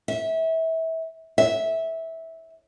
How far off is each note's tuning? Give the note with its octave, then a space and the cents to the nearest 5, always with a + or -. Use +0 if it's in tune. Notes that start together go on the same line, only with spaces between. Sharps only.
E5 -25
E5 -15